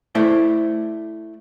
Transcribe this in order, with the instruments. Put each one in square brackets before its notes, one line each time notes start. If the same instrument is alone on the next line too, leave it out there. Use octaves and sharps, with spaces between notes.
[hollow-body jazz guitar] A3 E4 C5 D5